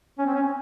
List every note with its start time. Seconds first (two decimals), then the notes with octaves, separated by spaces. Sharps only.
0.18 C#4
0.26 C4
0.35 C#4